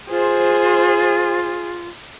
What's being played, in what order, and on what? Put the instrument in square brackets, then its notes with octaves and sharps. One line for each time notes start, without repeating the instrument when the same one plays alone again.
[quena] F4 [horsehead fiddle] G#4 [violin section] C5